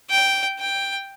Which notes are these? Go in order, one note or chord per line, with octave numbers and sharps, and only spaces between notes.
G5
G5